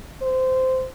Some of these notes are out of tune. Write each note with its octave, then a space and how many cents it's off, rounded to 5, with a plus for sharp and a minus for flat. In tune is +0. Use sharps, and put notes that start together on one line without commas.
C5 -15